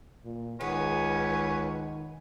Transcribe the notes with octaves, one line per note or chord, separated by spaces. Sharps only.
A#2
C#2 D#3 B3 G#4 B4 C#5 G#5